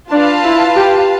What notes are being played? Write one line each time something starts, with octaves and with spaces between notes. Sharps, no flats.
D4 F4 B4 F5 A5
E4
G4